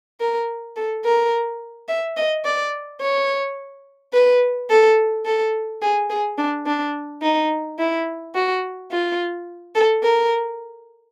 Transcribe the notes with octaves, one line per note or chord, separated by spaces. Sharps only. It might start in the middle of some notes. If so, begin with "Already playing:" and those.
A#4
A4
A#4
E5
D#5
D5
C#5
B4
A4
A4
G#4
G#4
D4
D4
D#4
E4
F#4
F4
A4
A#4